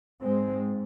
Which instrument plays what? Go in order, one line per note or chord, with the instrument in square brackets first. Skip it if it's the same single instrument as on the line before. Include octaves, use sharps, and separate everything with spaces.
[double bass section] G#2 G#3 C4